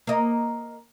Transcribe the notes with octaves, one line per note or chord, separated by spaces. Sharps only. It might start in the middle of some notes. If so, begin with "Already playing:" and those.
A#3 D#5